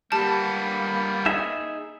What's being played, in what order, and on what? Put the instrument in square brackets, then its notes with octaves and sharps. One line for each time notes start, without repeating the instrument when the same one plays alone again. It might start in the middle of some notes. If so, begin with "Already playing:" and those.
[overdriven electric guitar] G3 B3 [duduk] A#3 [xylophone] G4 A5
[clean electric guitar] D#4 G#4 E5